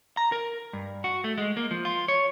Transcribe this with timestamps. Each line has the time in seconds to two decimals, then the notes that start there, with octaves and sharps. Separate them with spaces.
0.17 A#5
0.32 A#4
0.73 G2
1.04 F#4
1.24 A3
1.38 G#3
1.57 A#3
1.71 F3
1.85 F4
2.08 C#5